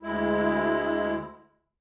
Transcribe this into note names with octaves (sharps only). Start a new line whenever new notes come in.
D2 G#3 E4